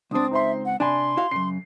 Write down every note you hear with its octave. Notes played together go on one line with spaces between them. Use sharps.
C#2 C4 D4 D#6
D#4 C5 E5 C6
F#5
C3 D4 D5 G#5 B5 C6
E4 F#4 F5
F#2 C#3 C7